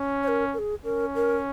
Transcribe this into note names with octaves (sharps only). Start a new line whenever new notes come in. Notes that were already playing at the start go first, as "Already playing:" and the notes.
Already playing: C#4
C#5
A#4
A#4
G#4
C#4 A#4
A#4